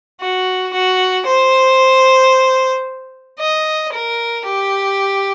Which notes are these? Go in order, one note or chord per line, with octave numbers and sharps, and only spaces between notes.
F#4
F#4
C5
D#5
A#4
G4